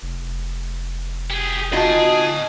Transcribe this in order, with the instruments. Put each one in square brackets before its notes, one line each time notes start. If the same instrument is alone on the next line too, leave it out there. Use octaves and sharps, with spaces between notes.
[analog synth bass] F1
[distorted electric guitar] G4 G#4
[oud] D#4 F4 F#4 [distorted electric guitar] G#4 [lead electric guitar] D#5 A5